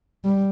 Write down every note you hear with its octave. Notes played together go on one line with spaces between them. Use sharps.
G3